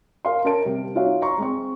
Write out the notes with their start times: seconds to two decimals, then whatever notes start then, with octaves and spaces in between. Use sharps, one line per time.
0.25 A#4 F5 C6
0.44 C#4 A#4 A5 D7
0.65 C3 G3
0.95 D#4 F4 F#4 C#5 E5 F5
1.22 A#5 C6 C#6
1.38 G#3 C4 C#6